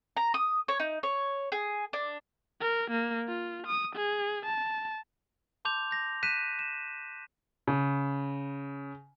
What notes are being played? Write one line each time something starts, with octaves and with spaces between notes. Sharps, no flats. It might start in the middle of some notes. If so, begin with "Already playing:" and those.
A#5
D#6
C#5
D#4
C#5
G#4
D4
A#4
A#3
F4
D#6
G#4
A5
A5 C6 D6 G6 F7
G6 A#6
F#6 B6 D#7 E7
E7
C#3